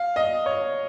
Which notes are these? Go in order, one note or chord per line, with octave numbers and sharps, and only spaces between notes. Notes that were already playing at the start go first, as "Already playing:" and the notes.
Already playing: F5
D#5
C#5